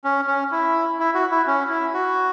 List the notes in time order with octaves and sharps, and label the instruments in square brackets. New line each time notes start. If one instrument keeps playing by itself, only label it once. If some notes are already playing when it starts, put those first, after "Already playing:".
[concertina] C#4
C#4
E4
E4
F#4
E4
C#4
E4
F#4